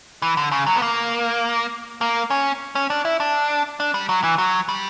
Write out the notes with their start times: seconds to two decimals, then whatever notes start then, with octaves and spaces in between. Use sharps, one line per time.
0.22 E3
0.37 D3
0.52 C#3
0.67 F#3
0.76 B3
0.82 A#3
2.01 A#3
2.30 C#4
2.75 C#4
2.90 D4
3.05 E4
3.20 D4
3.80 D4
3.94 G3
4.09 F#3
4.24 E3
4.38 F#3
4.69 G3